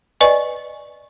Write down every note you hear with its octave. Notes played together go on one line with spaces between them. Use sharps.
B4 D5 D#5 G#5 C#6